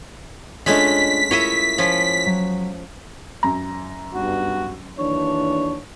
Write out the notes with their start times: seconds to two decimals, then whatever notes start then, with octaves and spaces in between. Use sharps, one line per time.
0.66 G#3 A3 C#4 D4 F4 D#5 B6
1.31 E4 F4 A#4 C#5 D#5 E5
1.78 F3 C#4
2.26 F#3
3.43 F#2 A#5
4.14 B1 G2 F#4
4.99 D#2 E3 D4 C#5